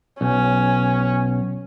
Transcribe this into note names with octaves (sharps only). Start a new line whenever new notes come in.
B1 C#4